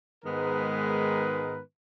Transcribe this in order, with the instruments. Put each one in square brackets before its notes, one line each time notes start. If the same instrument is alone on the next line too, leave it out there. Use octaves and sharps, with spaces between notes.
[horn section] G#2 D#3 G#3 B3 A#4 B4